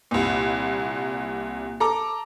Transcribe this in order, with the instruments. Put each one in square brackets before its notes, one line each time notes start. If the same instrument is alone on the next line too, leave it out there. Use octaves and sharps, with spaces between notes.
[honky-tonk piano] C2 A#2
A4 A#5 D6